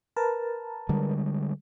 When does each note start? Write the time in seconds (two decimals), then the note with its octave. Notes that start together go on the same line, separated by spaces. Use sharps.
0.17 A#4 B4 A5
0.89 D3 G3 G#3